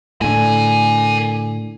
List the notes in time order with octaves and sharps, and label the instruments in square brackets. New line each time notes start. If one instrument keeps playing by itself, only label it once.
[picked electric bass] A2 D3 [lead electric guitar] A#4 G#5